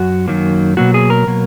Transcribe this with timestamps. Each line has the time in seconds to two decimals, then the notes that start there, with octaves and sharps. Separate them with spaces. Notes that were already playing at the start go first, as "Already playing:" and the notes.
Already playing: F#2 F#4
0.28 F#2 D#3 F#3 A#3
0.77 B2 F#3 A#3 F#4
0.94 G#4
1.10 A#4
1.27 B2 F#3 A#3